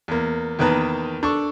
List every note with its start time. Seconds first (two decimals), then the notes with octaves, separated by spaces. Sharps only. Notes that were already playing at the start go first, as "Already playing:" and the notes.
0.08 E2 A#3
0.59 E2 D#3 A#3 B4 A5 A#5
1.23 D4 A4 C#6